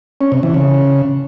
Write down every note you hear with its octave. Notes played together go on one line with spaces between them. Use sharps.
C#4
C3
E3
C#3